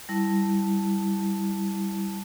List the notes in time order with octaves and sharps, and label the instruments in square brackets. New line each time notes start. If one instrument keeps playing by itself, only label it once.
[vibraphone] G3 E4 A5